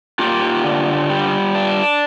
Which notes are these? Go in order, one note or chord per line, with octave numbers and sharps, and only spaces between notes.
A#3 F4 G4
D3
G3
D4